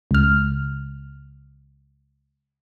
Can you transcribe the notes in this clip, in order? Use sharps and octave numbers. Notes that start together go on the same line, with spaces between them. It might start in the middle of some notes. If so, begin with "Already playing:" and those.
C#2 F6